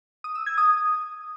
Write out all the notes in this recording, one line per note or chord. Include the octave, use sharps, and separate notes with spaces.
D#6
E6
G#6
D#6